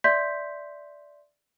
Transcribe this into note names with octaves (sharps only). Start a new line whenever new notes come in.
D5 E5 C6 G6 B6